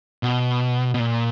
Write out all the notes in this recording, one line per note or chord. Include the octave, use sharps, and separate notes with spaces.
B2
B2
A#2